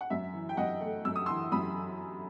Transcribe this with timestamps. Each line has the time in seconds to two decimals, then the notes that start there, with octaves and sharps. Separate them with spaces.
0.01 F#5
0.10 F#2 E5
0.33 E3
0.49 G5
0.57 F#2 D#5 F#5
0.81 A3
1.05 F#2 E6
1.16 D#6
1.26 C6 E6
1.29 E3
1.52 F#2 B5 D#6